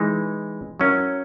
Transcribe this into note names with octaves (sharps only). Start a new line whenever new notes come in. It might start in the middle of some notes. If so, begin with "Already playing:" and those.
Already playing: E3 G#3 D#4
F#3 C#4 E4 A#4